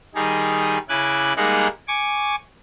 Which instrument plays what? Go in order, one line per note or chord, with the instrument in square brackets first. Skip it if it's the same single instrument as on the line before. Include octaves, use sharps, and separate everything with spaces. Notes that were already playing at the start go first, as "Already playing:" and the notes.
[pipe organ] D#3 G3 D#4 G#4
C#3 E4 G#5 D6 F#6
G3 G#3 A#3 D#4 G#4 F#5
G#5 C#6 D6